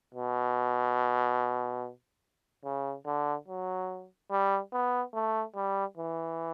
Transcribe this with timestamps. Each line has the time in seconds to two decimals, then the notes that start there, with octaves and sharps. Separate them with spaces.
0.15 B2
2.65 C#3
3.06 D3
3.48 F#3
4.31 G3
4.73 B3
5.14 A3
5.56 G3
5.98 E3